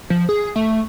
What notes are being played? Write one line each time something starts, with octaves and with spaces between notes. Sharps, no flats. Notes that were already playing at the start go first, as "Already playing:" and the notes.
F3
G#4
A3